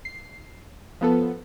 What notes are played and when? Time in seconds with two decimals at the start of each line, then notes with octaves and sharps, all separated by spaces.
0.05 C7
1.01 F3 B3 A4